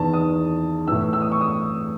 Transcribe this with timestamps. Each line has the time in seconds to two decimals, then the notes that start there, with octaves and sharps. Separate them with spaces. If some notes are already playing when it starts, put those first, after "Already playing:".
Already playing: E2 D#3 A5
0.13 D#6
0.88 A2 E3 E6
1.13 E6
1.22 D#6
1.32 C#6
1.41 D#6